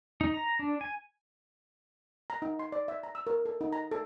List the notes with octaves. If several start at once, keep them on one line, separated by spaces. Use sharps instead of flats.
D#4
A#5
D4
G#5
A#5
D#4
C6
D5
E5
A#5
E6
A#4
A4
D#4
A#5
A4